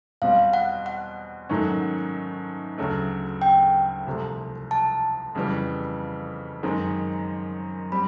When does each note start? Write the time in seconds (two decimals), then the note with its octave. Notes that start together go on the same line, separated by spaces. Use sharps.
0.22 E2 B2 G3 C4 F5
0.53 F#5
0.86 F#5
1.49 G#2 D#3 F#3 A3 C#4
2.78 D2 C#3 F#3 A3
3.42 G5
4.06 C2 C3 F3 A3
4.71 A5
5.35 F2 C#3 E3 G3 B3
6.63 F#2 D#3 G#3 C4
7.92 G3 C4 B5